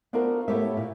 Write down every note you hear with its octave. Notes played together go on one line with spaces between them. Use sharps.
B3 D4 F4 F#4 A#4 C5
A2 A3 B3 G4 C#5 E5
A#2